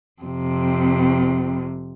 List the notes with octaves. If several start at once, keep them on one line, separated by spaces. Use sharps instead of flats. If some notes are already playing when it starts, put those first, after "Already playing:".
F2 C3